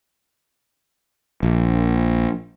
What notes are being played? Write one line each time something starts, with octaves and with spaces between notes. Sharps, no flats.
A#1